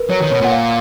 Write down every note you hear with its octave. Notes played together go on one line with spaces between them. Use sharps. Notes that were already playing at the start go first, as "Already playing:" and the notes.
Already playing: A#4 B4
F#3 C#5
D#3
B2 C#5
A#2 F#5
F5